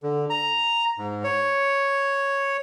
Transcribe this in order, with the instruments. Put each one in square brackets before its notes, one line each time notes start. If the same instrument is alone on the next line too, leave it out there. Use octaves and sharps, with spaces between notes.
[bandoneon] D3
A#5
G#2
C#5